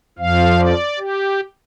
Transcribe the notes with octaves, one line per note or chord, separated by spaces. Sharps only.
F2 F3 F5
D5
G4